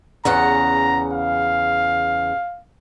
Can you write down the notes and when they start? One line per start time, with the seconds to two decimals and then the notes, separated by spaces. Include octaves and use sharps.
0.25 E2 C#3 F#5 A#5
1.13 F5